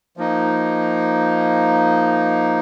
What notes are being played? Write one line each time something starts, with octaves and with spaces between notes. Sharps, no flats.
F3 A#3 D#4